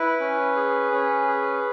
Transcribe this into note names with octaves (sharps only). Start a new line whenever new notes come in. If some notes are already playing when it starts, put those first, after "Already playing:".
Already playing: E4 B4
C#4
G#4
C#4
G#4